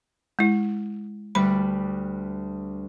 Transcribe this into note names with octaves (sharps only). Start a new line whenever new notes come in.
G#3 E4
D2 G3 B4 B5